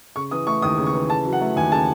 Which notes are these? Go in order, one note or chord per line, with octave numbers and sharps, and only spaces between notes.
C#3 C#6
E3 D#6
A3 C#6
D#2 D#6
C#3
C#6
E3
C#3 A5
F#3
F#5
A3
D#2 G#5
C#3 A5